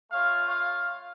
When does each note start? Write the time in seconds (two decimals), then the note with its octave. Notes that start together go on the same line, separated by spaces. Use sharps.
0.11 A3 F4 C#5 F5
0.49 C#5 F5